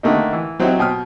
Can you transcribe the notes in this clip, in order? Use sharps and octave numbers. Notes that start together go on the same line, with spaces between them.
D3 D#3 A3 A#3 D#4
E3
F#3 C4 D#4 E4 F#4 G4
B2 G5 D#6 F6